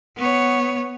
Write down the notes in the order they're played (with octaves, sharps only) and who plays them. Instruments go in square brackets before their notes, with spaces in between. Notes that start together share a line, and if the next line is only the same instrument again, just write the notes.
[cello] B3 C#5